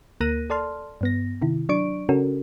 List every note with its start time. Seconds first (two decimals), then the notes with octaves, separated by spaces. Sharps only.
0.21 D2 A#3 A#4 F#6 A#6 D#7
0.50 A4 D5 A5 C6 F6
1.01 G2 B3 A#6
1.42 C3 D#3 E4
1.69 F#3 D4 D5 C#6 D7
2.09 C#3 C#4 F#4 A4 A#4